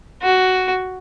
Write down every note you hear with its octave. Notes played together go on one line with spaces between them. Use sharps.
F#4